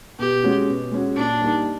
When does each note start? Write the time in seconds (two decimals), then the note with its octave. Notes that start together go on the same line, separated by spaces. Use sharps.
0.19 B2 G4
0.43 G#3 C#4 F#4
0.68 B2
0.92 G#3 C#4 F#4
1.16 A#2 D4
1.41 G3 A#3 D#4